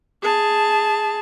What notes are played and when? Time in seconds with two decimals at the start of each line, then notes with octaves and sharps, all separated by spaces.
0.22 G#4 A5